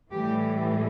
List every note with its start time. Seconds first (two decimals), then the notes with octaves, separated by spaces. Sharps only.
0.12 A2 E3 G3 G4